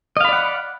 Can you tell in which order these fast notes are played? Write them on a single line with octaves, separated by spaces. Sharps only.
D#5 F5 B5 D5 F#5